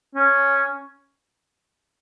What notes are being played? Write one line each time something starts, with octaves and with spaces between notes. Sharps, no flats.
C#4